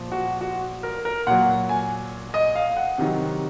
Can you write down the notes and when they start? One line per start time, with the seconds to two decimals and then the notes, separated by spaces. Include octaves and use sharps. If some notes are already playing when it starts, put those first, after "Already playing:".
Already playing: A#2 F3
0.12 F#4
0.41 F#4
0.83 A#4
1.05 A#4
1.27 A#2 F#3 F#5
1.69 G#5
2.34 D#5
2.55 F5
2.77 F#5
2.98 C3 D#3 F#3